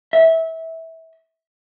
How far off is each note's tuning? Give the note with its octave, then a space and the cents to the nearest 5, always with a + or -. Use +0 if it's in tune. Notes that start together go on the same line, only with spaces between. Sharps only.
E5 -20